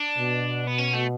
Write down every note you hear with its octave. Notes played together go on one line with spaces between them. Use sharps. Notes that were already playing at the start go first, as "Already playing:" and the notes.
Already playing: D4
B2
B3
C#4
A3